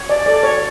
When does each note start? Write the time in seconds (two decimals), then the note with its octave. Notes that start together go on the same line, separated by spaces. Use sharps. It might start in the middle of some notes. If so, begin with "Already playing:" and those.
Already playing: C#5
0.09 D5
0.26 A4 D5
0.43 C#5